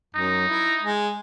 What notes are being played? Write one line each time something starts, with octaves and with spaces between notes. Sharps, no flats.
F#2 D#4
E4
G#3